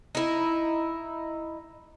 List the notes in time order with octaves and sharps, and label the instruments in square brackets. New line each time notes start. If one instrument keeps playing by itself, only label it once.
[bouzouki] D#4 E4